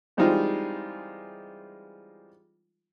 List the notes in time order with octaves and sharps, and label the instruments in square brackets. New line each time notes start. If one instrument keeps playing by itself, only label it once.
[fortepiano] E3 G3 G#3 C4 D#4 F4